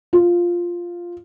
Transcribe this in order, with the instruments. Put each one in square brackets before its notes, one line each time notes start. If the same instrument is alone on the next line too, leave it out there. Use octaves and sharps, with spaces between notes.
[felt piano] F4